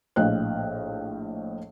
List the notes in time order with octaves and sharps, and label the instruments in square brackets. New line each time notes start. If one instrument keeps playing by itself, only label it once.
[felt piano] A#1 A2 D#5 F5 G5 F#6